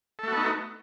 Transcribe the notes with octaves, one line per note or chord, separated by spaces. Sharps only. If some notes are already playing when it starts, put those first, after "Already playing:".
A3 B3 D#4 F#4 A4